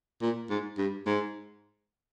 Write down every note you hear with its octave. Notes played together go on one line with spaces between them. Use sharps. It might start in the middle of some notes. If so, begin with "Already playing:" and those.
A#2
G#2
G2
G#2